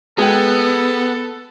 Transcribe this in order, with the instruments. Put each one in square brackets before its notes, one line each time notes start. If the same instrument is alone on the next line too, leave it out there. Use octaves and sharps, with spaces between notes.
[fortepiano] G#3 G5 [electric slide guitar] B3 [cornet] A4